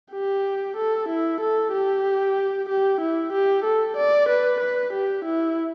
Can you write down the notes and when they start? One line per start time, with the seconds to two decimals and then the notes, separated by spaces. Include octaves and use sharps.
0.12 G4
0.77 A4
1.08 E4
1.40 A4
1.73 G4
2.69 G4
3.01 E4
3.33 G4
3.64 A4
3.97 D5
4.28 B4
4.60 B4
4.93 G4
5.25 E4